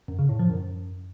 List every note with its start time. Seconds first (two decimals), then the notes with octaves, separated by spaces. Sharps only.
0.08 F#2
0.19 C#3
0.29 A2
0.39 F3
0.50 F#2